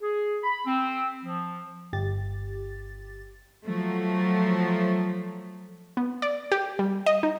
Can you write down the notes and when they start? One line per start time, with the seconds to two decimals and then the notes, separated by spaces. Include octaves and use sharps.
0.01 G#4
0.43 B5
0.66 C4
1.24 F3
1.93 G1 G4 A6
3.66 F3 F#3 A3
5.97 B3
6.22 D5
6.52 G4
6.79 G3
7.06 D#5
7.23 D#4